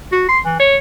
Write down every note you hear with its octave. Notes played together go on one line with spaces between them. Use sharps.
F#4
C6
E3
C#5